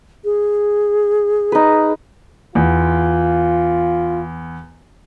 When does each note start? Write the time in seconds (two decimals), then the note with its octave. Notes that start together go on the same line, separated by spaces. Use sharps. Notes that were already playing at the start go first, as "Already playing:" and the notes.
0.24 G#4
1.52 D#4 B4
2.55 E2 F4